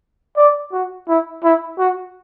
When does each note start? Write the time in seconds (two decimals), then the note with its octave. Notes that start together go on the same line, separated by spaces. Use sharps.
0.37 D5
0.72 F#4
1.08 E4
1.44 E4
1.79 F#4